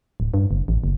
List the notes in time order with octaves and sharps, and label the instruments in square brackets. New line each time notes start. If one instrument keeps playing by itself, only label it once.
[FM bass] D1
G2
F#1
A1
F#1